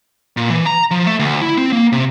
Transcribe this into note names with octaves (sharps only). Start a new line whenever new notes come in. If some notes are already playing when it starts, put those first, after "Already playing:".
A#2
E3
A#5
F3
A3
D2
E4
C4
A#3
C3